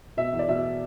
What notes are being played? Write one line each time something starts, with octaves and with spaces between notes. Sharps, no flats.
B2 E5
E2
D5
B2 E5